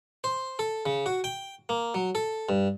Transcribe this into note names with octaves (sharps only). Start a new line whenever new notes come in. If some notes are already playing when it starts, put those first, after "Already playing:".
C5
A4
C#3
F#4
G5
A#3
F#3
A4
G2